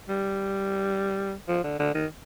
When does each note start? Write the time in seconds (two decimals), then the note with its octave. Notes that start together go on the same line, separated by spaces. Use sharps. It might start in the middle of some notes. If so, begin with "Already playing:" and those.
0.09 G3
1.48 F3
1.64 D3
1.79 D3
1.94 D#3